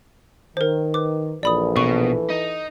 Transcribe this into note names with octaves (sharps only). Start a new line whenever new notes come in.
D#3 A#4 C5
B4 D6
A#1 E3 A4 B4 D5 B5 D#6
B2 C#6
D#4